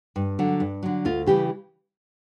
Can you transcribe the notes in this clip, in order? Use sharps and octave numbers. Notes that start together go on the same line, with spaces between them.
G2
D3 F#3
G2
D3 F#3
D2 F4
C#3 E3 G3 G4